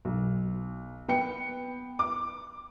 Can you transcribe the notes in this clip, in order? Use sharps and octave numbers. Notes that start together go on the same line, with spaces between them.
B1
B3 G5 C#7
D6